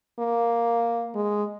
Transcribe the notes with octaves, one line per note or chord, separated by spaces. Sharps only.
A#3
G#3